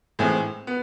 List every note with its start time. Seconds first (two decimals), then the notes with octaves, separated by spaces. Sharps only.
0.19 A2 E3 G#3 C4
0.67 B3